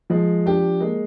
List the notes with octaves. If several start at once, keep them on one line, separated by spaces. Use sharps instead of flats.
F3 G#3
D4 G4
G#3 A#3